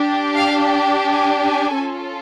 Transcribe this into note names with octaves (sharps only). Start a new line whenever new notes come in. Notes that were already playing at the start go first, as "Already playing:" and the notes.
Already playing: D4 G4
F5
G#5
G#5
C#4 F4 A4